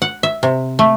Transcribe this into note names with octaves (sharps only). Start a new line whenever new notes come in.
F#5
E5
C3
A3